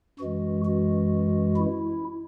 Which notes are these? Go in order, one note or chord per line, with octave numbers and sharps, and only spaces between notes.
F#2 E3 G#3 F#4
F#4
E4